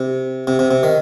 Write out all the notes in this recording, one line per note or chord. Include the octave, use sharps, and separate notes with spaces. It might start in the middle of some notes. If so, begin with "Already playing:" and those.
Already playing: C3
C3
C3
C3
D#3